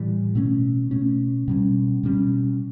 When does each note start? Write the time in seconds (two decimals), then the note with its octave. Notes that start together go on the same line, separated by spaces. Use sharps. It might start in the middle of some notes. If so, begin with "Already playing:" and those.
Already playing: A2 E3 G3
0.35 B2 A3 C#4
0.91 B2 A3 C#4
1.48 B2 G3 C#4
2.03 B2 G3 C#4